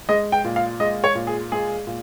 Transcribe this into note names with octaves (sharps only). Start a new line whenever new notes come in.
G#3 D#5
G5
A#2
F5
G#3 D#5
C#5
A#2
G#4
G#3 G#4
A#2